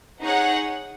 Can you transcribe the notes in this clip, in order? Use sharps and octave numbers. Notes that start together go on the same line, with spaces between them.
D#4 G#4 C#5 F#5